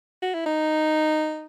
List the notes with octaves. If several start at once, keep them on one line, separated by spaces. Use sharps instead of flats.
F#4
E4
D#4